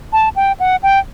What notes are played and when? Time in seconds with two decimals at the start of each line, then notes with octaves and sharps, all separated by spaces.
0.13 A5
0.36 G5
0.60 F#5
0.83 G5